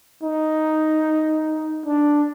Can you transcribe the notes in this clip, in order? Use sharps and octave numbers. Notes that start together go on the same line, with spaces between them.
D#4
D4